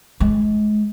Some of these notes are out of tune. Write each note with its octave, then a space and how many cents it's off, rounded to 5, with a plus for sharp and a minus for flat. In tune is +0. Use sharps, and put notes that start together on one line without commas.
G#3 +30